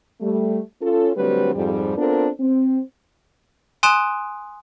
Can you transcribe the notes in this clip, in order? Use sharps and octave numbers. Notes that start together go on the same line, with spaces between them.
G3 A3
C#4 F4 A4
D3 F#3 G3 A3 C4 B4
F2 G#2 G3
B3 C4 D4 F4 A4 A#4
C4
G#5 C6 D#6 F#6 D7 E7